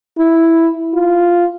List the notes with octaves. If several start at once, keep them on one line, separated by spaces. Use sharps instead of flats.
E4
F4